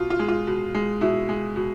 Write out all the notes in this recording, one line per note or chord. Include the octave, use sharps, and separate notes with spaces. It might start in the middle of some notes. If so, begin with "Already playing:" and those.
Already playing: B2 F4
F4
G#3
F4
B2
G#3
B2 E4
G#3
B2